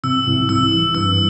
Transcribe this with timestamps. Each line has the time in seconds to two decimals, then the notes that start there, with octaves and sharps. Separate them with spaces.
0.03 C3 E6
0.27 C2
0.49 C2 E6
0.72 E3
0.95 G2 E6